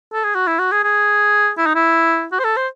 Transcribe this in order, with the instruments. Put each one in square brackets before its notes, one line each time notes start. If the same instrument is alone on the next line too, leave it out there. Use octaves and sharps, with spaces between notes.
[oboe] A4
G#4
F#4
E4
F#4
G#4
G#4
E4
D#4
E4
F#4
C5
A4
C5